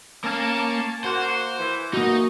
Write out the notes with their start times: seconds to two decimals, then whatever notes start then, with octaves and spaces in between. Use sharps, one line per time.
0.24 A#3 C#4 F5 A5
1.04 A#3 F#4 C5
1.58 E3
1.93 A#3 D#4 F#4 D#5